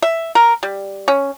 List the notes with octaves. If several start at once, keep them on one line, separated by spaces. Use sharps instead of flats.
E5
A#4
G3
C#4